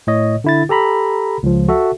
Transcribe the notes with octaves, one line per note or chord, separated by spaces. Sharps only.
A2 C#5 D#5
D3 E4 A6
G4 A4 A#5 B5
C#2 F3
F#4 A4 E5